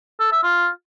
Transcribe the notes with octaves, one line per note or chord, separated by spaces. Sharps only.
A4
E5
F4